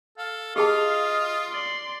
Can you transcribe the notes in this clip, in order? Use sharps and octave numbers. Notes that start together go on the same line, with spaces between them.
A4 F5
F4 G4 G#4 D#5 F5 A5
D5 C6